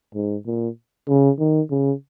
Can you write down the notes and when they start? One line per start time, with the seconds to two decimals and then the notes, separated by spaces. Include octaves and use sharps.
0.15 G#2
0.46 A#2
1.09 C#3
1.39 D#3
1.70 C#3